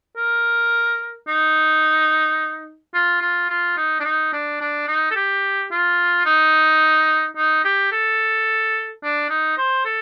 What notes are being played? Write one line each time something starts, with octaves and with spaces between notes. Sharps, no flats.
A#4
D#4
F4
F4
F4
D#4
D4
D#4
D4
D4
D#4
A4
G4
F4
D#4
D#4
G4
A4
D4
D#4
C5
A4